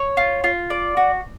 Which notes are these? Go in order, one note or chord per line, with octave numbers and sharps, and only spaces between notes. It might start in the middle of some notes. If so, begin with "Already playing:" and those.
Already playing: C#5
F4
F4
D5
F#4